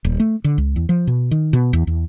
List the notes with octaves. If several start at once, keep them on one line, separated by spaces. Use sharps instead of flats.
D#1
A3
D3
C#2
E2
F3
B2
D#3
B2
E2
E2